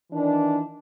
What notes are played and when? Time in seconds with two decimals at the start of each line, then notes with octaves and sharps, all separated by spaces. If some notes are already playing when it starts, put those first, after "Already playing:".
0.12 D#3 E3 D4